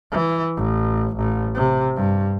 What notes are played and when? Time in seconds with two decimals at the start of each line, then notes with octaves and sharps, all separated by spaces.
0.11 E3
0.56 A1
1.16 A1
1.55 C3
1.96 G2